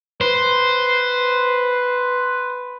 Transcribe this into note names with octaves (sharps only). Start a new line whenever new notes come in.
B4 C5